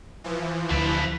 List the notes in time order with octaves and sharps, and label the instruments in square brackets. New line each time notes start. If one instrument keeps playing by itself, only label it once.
[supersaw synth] E3 F3
[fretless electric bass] D2 [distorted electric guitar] B4 A5